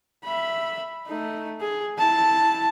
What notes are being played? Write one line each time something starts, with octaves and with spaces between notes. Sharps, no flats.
E5 B5
A3 D#4
G#4
E4 A5